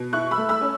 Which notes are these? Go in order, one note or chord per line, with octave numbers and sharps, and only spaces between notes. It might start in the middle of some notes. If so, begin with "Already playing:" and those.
Already playing: B2
E4 C#6 F#6
B5 E6
A3
B5 E6
C#4